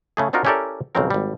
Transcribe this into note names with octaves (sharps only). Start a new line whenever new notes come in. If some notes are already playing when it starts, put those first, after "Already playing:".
C#3 A3 G#4
C4 D4 D#4 F4 F#4 A#4
C#4 E4 G4 A4 A#4 D5
B1 F2 C#3 G#3 C4 A#4
G#1 G3